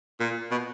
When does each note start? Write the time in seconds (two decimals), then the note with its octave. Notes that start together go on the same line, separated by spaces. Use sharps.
0.20 A#2
0.51 B2